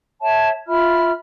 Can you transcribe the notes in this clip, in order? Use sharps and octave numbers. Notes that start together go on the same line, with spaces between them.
C#5 E5 A5
F4 E5 B5 F6